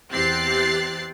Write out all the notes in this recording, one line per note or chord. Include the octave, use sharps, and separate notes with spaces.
E2 C4 G4 F#6 A6 C7